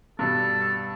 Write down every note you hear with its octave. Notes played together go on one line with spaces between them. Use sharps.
G2 B2 G3 A4